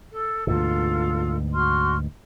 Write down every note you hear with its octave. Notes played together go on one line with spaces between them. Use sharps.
A4
D2 G#2 B2 F4 A4
F#4 C6 F6